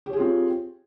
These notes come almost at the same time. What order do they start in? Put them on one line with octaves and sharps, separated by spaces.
G4 C#5 G#4 F4 C4